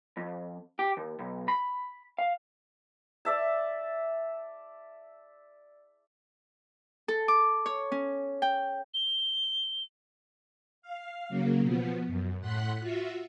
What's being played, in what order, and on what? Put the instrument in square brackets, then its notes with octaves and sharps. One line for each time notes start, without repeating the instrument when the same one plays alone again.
[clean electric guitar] F2
G4
D#2
B1
B5
F5
[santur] D5 E5 A5
[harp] A4
D6
C#5
C#4
G5
[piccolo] G7
[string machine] F5
C#3 F#3 A#3
B2 F3 B3
F#2
A2 F#5 C6 F#6 B6
F4 F#4 E5